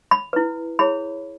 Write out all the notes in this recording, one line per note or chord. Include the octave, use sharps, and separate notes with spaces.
B5
E4 B4
E4 G#4 C#5 B5